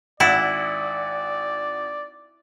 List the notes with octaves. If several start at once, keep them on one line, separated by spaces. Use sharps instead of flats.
G#1 E4 D5 F#5 A6